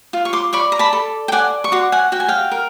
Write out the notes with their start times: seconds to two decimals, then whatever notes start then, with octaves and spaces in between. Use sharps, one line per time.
0.13 F4
0.25 C#6
0.33 C6 D6
0.53 D5 B5 C#6
0.72 A#5
0.79 A5 B5
0.93 A4
1.28 G5
1.32 D5 F#5 G#5
1.64 C#6
1.72 F#4 C6 D6
1.92 F#5 G#5
2.12 F#4 G5
2.20 G#5
2.28 F5 G5
2.51 A#4